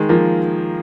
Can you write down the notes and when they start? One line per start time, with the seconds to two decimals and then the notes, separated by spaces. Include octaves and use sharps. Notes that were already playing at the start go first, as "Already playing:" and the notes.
Already playing: D#3 G#3
0.09 F3 A#3